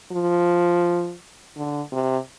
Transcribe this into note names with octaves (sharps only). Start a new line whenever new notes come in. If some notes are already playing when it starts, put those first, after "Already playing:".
F3
D3
C3